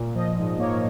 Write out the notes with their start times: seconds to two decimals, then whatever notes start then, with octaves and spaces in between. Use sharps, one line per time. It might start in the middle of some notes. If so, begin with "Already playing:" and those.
Already playing: A#2
0.15 F3 D#5
0.37 G#2
0.59 A#3 C#5